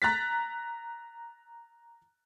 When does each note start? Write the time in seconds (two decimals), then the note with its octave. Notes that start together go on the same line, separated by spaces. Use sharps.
0.02 A#5 F#6 A6 B6